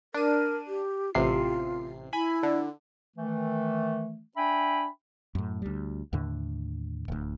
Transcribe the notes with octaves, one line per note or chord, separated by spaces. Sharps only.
D4 A#4 D#7
G4
A1 C3 F4 C7
E4 G#5 B5
D3
D#3 E3 A3
D4 E5 G5 G#5 B5
F#2 A2
D2 G3
D#2 A2 D3
D1 D2